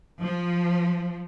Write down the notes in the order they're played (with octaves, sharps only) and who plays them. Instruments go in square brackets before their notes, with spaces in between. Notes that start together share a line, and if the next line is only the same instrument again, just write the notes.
[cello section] F3